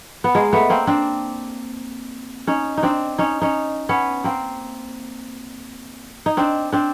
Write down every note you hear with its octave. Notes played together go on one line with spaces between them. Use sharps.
B3
G#3 A#3
A3 B3
A#3 C4
C4 D4
C#4 D#4
D#4
C4 D4
C#4 D#4
C#4 D#4
B3 C#4
A#3 C4
D#4
C4 D4
C4 D4